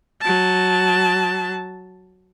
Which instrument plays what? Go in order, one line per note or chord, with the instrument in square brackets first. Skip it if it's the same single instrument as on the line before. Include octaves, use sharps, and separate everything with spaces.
[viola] F#3 A5